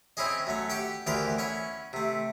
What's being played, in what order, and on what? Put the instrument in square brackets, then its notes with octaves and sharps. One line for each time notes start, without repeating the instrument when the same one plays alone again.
[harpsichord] C4 C#4 E4 G#4 D#5
F#2 A3 C#4
G4 F#5 G5
D2 E3 G4 A#4 C5 C6
C#4 E4 F#5
C3 A3